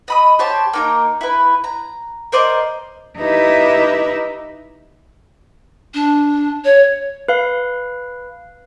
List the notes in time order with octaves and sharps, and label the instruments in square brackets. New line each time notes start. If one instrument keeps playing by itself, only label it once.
[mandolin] D#5 B5 D#6
G4 C5 C#5 A5
A#3 D#4 A#4
E4 B4
A#5
A#4 C5 D5 D#5
[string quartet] D#4 E4 G4 B4 E5
[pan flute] D4
C#5
[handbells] B4 F5